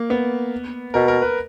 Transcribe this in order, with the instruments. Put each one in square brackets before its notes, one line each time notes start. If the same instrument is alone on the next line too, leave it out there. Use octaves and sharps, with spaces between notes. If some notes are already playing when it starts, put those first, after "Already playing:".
Already playing: [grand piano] A#3
B3
[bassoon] B2 [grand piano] A#4
[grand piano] A#4
B4